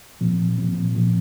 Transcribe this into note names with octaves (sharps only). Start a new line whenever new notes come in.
A#2 F3 C4
A#2 F3 C4
A#2 F3 C4